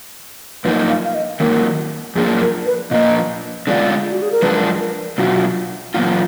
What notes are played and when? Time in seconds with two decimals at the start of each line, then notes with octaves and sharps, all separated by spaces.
0.64 F#2 F3 A#3 D#4 B4
0.89 F5
1.05 F5
1.14 D#5
1.40 D#3 F#3 A#3 F4 A#4
2.16 F#2 F3 A#3 D4 G#4
2.41 A#4
2.66 B4
2.91 A#2 F3 A#3 D#5
3.67 D3 G#3 B3 F4 D5
4.11 F#4
4.22 G#4
4.32 A#4
4.42 F#2 F3 G#3 D4 B4
4.80 A#4
5.18 B2 F#3 D4 F4 F#4
5.94 A#2 F#3 A#3 B3 F4